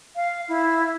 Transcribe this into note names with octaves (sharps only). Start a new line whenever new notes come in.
F5
E4